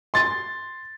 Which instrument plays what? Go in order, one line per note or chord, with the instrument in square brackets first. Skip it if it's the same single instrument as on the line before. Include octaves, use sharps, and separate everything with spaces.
[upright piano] C6 A6